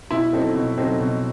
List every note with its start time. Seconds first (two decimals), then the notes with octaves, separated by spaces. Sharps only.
0.11 B2 E4
0.33 F#3 C4 D#4 A4
0.55 B2
0.77 F#3 C4 D#4 A4
1.00 B2